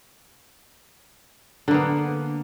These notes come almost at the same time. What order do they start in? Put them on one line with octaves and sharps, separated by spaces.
D3 A#3 B3